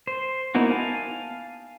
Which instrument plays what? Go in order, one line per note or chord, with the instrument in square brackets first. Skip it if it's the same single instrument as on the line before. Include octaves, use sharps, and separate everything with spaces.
[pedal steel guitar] C5
A#3 B3 D#4 E4 F#4
F5 G#5 A5